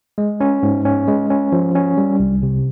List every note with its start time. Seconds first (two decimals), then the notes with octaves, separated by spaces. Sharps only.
0.18 G#3
0.40 C#4
0.63 G#2
0.85 C#4
1.08 G#3
1.30 C#4
1.52 F3
1.75 C#4
1.97 G3
2.20 C2
2.43 C3